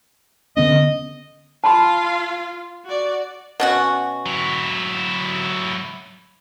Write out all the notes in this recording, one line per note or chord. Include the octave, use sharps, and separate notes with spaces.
D3 B3 C#4 D#5
F4 F5 A5 B5 C6
F#4 D5
B2 C#4 F#4
F#3 E4